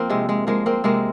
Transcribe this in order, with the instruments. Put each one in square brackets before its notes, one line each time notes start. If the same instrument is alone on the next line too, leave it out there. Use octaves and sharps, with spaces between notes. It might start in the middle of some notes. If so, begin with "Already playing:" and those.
Already playing: [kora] F3 A#3 C4
C3 G#3
G#3
F3 G#3 A#3
A#3 C4
C3 G#3 A#3